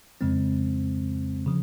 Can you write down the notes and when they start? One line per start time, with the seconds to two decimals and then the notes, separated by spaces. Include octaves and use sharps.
0.21 F2 C#3 G#3 C4
1.46 C#3 F3